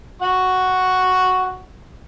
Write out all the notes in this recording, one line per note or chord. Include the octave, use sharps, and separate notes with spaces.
F#4 F#5 C#6